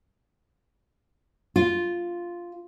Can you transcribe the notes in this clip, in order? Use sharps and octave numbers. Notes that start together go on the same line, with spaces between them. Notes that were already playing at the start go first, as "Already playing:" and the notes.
F4